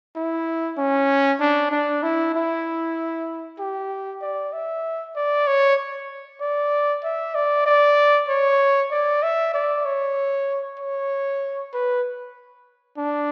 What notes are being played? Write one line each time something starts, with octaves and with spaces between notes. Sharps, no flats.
E4
C#4
D4
D4
E4
E4
G4
D5
E5
D5
C#5
D5
E5
D5
D5
C#5
D5
E5
D5
C#5
C#5
B4
D4